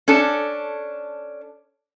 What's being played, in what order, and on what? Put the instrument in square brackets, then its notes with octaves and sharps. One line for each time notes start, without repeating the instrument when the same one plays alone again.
[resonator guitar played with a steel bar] C#4 D4 A4